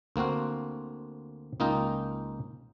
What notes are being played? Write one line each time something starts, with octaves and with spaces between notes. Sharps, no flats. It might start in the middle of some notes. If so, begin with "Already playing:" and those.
D2 A#3 C4 F#4 F5
C#2 A#3 D#4 F4 A#4 G5